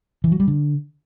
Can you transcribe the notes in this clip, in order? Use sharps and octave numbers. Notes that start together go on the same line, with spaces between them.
E3
F#3
G3
D3